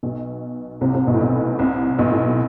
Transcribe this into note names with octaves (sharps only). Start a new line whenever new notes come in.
B1 B2
C2 C3
C2 C3
B1 B2
A2
B1 B2
C2 C3
B1 B2
A2
B2